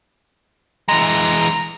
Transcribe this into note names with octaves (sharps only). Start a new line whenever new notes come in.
E3 G#3 A#5